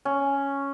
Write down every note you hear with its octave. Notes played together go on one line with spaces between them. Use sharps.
C#4